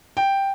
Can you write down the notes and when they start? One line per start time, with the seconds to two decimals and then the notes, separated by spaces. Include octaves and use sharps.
0.17 G5